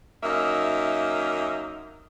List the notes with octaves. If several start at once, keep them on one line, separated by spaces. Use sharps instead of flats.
F#2 A#3 D#4 E5